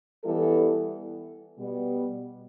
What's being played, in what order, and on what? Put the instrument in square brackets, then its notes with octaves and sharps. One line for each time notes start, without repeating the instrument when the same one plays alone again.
[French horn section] E3 G3 B3 E4 A4
B2 G3 B3